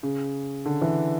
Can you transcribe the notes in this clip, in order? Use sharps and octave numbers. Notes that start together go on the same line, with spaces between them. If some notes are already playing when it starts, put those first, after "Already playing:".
C#3
D3
E3